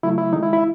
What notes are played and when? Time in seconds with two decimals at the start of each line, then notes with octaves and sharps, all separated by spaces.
0.03 C#3 F#3 A3 E4
0.18 E4
0.33 D#3 G#3 D#4
0.43 E4
0.53 E4